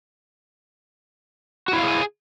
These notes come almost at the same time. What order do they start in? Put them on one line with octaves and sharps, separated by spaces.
F#4 E4 F5 G#4 G#5